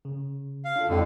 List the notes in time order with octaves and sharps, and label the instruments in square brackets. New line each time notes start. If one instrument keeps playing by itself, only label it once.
[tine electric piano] C#3
[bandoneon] F5
[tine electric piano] D4 F4 A4
[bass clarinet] F2 [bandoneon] A2 D3 [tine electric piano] G#3 F#4 G4